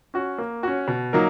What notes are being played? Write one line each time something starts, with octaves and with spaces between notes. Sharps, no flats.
C#4 F#4
A#3
C#4 F#4
B2
F#3 A#3 D#4 A#4